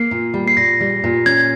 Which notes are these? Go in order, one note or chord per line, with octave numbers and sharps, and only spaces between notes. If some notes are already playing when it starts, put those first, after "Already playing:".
Already playing: A#3 C7
A#2
G3
C7
A#2 A#6
G3
A#2
C#4 G#6